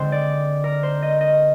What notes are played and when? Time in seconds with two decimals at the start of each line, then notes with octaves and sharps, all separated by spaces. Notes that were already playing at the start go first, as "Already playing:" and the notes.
Already playing: D3 G#3 C4 C5
0.12 D5
0.64 A#4
0.83 C5
1.02 D#5
1.21 D#5